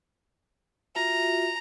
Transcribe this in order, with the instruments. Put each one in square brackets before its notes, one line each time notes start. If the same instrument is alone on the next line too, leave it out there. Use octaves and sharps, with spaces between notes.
[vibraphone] F4 F#4 E5 [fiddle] A#5